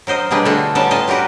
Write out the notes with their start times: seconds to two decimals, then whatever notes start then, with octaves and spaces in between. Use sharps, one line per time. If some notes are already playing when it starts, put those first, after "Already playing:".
0.07 F#3 A#4 C5 D#5
0.31 B2 G3 D4 G#4 B4
0.45 D3 A3 B3 F4 F#4 A4
0.75 G3 B3 C#4 D#4 A4 A5
0.91 A2 F4 D#5 G#5 A5
1.08 G3 F#4 G4 A#4 B4